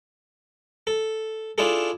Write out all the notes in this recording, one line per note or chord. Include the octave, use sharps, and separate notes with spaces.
A4
D4 E4 F4 G#4 A4